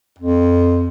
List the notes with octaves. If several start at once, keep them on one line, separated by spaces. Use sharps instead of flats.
F2